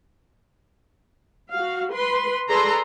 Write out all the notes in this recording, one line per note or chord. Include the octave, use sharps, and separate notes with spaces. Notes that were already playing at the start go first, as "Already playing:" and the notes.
F#4 F5
B4 C6
G#4 A4 B4 D5 A#5 C6